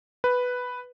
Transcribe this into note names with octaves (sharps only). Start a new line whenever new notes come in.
B4